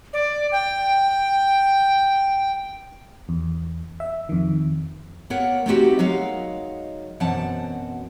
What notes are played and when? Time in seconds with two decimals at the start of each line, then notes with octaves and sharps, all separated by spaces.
0.13 D5
0.52 G5
3.29 E2
4.00 E5
4.29 F2 D#3
5.30 A#3 B3 A#4 C#5 F#5
5.66 A3 B3 C4 D#4 F#4 G4
5.99 F#3 G#3 D#4 A#4 F5 F#5
7.20 F#2 B2 E3 C4 F#5 A5